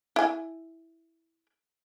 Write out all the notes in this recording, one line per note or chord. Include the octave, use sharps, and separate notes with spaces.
E4 G#5